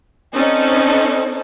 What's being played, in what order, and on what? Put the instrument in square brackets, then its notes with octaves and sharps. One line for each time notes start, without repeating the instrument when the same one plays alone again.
[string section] C4 C#4 D#4 A4 C5 D5